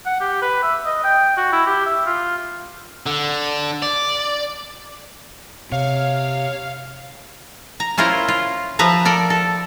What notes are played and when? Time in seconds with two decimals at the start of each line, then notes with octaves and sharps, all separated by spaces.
0.06 F#5
0.21 G4
0.42 B4
0.63 E5
0.86 D#5
1.04 G5
1.37 F#4
1.53 E4
1.67 G4
1.86 E5
2.06 F4
3.06 D3
3.82 D5
5.72 C3 C#5 F5
7.80 A#5
7.98 C#4 E4 F4 A#4 C5
8.28 F4
8.79 F3 B4 E5 A#5
9.05 A4 A#4 D5
9.30 A4